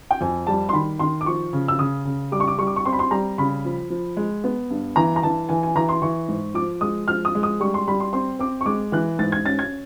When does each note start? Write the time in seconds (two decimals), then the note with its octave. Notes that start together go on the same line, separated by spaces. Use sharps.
0.11 G5
0.21 F2 G#5
0.47 G3 A5
0.69 C6
0.73 D#3 B5
1.00 D#3 C6
1.21 D6
1.26 F3 C#6
1.53 C#3
1.68 E6
1.79 C#3 D#6
2.05 C#3
2.32 G3 D6
2.40 C#6
2.48 D6
2.58 G3 C#6
2.67 D6
2.76 C#6
2.85 C4 C6
2.92 B5
2.99 C6
3.11 G3 A#5
3.38 C#3 B5
3.65 F3
3.90 F3
4.17 G#3
4.44 B3
4.71 G2
4.96 E3 A#5
5.16 A#5
5.23 E3 A5
5.49 E3 G#5
5.63 G#5
5.75 E3 A#5
5.89 C6
6.02 E3 C#6
6.28 G#2
6.54 F3 D6
6.81 G#3 D#6
7.08 F3 F6
7.25 D#6
7.35 G#3
7.43 D#6
7.60 G3 C#6
7.74 C6
7.88 G3 B5
8.00 C6
8.13 C4 C6
8.39 C4 D6
8.61 C#6
8.66 G#3 D6
8.92 E3 F#6
9.19 G#2 A6
9.32 G#6
9.45 C#4 A6
9.59 G#6